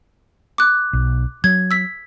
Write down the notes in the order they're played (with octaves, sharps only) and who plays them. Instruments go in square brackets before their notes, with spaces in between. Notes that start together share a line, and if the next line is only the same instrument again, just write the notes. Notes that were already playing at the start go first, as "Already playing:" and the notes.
[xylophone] D6 F#6
[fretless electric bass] B1
[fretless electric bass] F#3 [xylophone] G#6
[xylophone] E6 B6